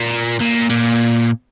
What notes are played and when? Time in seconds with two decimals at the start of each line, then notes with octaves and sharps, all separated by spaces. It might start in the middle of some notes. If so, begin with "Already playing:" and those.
Already playing: A#2
0.40 A#2
0.70 A#2